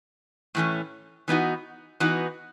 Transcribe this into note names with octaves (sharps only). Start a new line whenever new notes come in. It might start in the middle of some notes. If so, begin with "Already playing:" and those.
A2 E3 A3 C#4
E3 B3 D#4 F#4
E3 B3 D#4 F#4